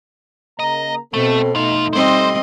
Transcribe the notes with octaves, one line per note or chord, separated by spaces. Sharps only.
C#3 A#3 D#5 A#5
B2 A3 C4 A4
F2 A3 D#4 F4
G3 C4 C5 D#5